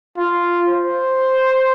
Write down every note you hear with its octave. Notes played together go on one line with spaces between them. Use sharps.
F4
C5